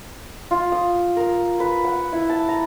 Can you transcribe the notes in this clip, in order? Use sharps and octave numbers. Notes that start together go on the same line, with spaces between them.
F4
D#6
A#4
B4
F#5
E4
A5
A#5